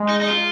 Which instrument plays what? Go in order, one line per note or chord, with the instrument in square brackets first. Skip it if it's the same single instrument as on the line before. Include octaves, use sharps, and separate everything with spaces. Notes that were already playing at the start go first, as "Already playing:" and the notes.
Already playing: [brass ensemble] G#3
[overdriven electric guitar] D#4
D#4
F4